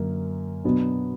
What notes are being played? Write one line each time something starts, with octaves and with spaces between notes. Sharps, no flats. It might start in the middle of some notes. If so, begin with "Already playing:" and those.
Already playing: F#2 D3 A#3
B2 F#3 B3 D4 F#4